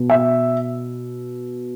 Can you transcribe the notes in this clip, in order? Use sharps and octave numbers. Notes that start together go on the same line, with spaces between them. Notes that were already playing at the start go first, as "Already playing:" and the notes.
Already playing: B2 B3
E5